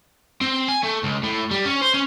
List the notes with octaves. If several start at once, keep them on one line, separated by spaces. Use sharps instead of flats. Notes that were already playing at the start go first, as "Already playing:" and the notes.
C4
G#5
A3
C#2
A2
G3
C#4
C5
C#4